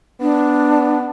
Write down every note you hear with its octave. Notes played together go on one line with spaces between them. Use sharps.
B3 D4